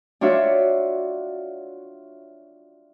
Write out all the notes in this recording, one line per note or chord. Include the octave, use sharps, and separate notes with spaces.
D4 F4 F#4 C#5 E5